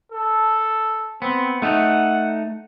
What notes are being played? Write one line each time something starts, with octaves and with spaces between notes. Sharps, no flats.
A4
B3 C4
A3 D#4 F#5